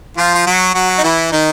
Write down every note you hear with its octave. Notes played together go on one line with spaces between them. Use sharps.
F3 F4
F4
F#3 F#4
F#3 F#4
D#4
E3 E4
D#3 D#4